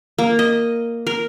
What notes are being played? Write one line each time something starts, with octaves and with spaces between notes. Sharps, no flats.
A#3
D#5
A#4